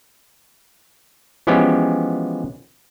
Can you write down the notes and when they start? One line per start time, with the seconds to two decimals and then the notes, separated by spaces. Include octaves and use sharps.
1.47 E3 F3 G#3 B3 C#4 G4